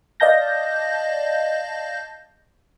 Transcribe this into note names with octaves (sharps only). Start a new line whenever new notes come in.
D5 D#5 F5 A5 G6 A#6